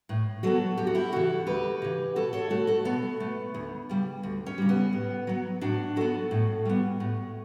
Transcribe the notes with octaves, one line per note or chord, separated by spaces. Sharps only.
A2
F#3 B3 F#4 A4
D2 G4
F#4
E4 G4
C#3 E3 F#4 A4
D2 G4 B4
C#3 E3
B2 F#4 A4
A4 C#5
A3 F#4 A4
F#4 A4
B2 B3
A3
D2
C#3 G3
D2
C#4
C#3 G3
B3
A2
F#3 B3
A2 D4 F#4
F#3 B3 F#4 A4
A2
G3 B3
A2